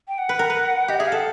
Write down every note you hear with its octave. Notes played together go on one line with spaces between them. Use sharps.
G5
F#5
B4
A#4
B4
G4 D#5
G#4 E5
F5
A4 F#5